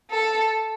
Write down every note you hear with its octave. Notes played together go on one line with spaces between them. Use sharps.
A4